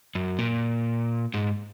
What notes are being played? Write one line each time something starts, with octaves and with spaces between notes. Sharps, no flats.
F#2
A#2
G#2